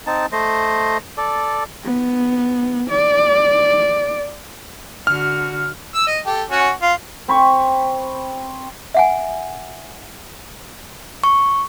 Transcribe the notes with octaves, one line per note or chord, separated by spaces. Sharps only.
C4 D#4 A5
A3 C5 D#5
A4 D5
B3
D5
D3 F#4 F6
E6
D#5
G4 A4
C#4 F#4
F4
C4 B5 C#6
E5 F#5 G#5
C#6